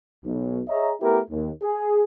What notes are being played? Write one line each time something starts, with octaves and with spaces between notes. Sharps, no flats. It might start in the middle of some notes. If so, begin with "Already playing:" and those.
B1
G#4 C#5 D#5 E5 A#5
A3 B3 E4 G4 A#4
D#2
G#4